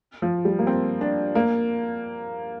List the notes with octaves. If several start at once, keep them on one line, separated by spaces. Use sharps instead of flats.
F3
G3
A#3
C4
D4
A#3